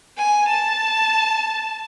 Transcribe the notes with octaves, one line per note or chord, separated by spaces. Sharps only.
G#5
A5